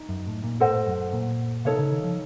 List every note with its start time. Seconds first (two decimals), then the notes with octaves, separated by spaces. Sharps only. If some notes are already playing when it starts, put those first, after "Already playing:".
Already playing: D#4
0.09 F#2
0.26 A2
0.44 A#2
0.60 A2 A4 C5 D#5 F#5
0.87 F#2
1.13 A#2
1.65 C3 D#4 A4 C#5 F5
1.79 C#3
1.92 D#3
2.04 F3